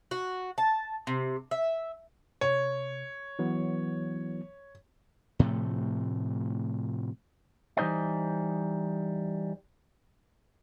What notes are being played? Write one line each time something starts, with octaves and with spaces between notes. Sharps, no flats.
F#4
A5
C3
E5
C3 C#5
E3 F#3 B3
A2 C3 F3 A3
E3 G3 D#4 C5 D5 D#5